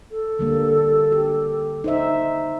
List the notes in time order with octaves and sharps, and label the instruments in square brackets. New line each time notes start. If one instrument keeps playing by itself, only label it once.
[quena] A4
[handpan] D3 G3 A#3
G4
D#4 C5 E5